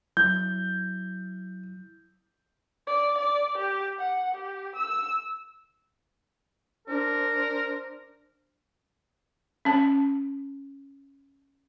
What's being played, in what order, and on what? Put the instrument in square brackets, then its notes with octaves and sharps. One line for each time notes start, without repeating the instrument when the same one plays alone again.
[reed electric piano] F#3 E4 [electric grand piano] G6
[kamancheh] D5
D5
G4
F#5
G4
E6
[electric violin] D4 C5 [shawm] A#4
[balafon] C#4 A5